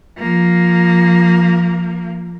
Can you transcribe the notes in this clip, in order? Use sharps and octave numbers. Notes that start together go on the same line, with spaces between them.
F3 A#3